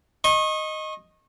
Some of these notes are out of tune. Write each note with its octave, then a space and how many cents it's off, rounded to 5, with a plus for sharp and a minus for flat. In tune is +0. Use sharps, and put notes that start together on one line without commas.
D#5 +0 C#6 -35